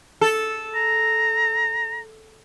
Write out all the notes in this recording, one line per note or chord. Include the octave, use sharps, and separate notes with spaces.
A4
A#5